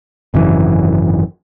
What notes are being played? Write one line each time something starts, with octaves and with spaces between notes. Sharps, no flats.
G#1 F#2 C#3 E3